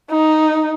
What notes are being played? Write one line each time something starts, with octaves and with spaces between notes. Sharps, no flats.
D#4